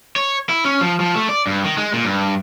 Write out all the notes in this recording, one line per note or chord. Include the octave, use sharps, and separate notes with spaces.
C#5
E4
C#4
F3
F3
A3
D5
G2
D#3
G#3
A#2
G2